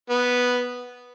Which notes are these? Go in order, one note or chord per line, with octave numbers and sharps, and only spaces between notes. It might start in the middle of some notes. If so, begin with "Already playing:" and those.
B3